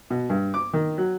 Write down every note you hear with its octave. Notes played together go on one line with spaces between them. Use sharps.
B2
G2
D6
D#3
F#3